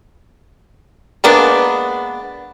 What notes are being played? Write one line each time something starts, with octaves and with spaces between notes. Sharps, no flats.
G#3 A#3 B3 D4